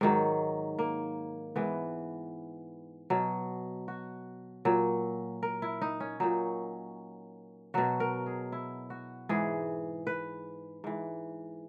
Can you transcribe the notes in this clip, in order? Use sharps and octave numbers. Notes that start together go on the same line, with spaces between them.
G#2 D#3 F#3
A#3
G#2 E3 B3
B2 F#3
F#4
A#2 F#3
A#4
E4
D#4
C#4
A#2 F#3 D#4
B2 F#3 F#4
A#4
G#4
E4
F#4
G#2 E3 G#4
B4
G#2 E3